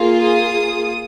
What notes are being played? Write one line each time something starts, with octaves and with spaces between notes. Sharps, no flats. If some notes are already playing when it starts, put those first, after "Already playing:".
Already playing: A#3 F4 G#4
D#6